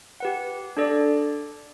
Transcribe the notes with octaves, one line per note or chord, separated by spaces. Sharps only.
G4 B4 F#5
D4 A4 D5